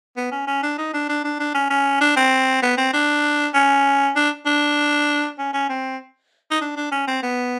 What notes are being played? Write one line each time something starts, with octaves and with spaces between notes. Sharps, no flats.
B3
C#4
C#4
D4
D#4
D4
D4
D4
D4
C#4
C#4
D4
C4
B3
C4
D4
C#4
D4
D4
C#4
C#4
C4
D#4
D4
D4
C#4
C4
B3